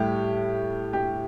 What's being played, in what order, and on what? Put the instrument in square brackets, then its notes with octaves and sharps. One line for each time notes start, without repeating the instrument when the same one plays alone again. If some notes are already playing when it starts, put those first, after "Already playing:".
Already playing: [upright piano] A2 G3 G4
G4